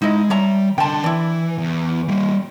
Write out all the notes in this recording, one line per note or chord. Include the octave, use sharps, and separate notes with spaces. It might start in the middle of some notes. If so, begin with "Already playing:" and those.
G#3 D#4 E4 D#5
G3 C#5 E5 A#5
D3 G5 A5 C6
E3 E4 D5
E2
G3 A#3